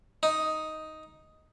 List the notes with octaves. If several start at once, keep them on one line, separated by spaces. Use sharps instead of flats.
D#4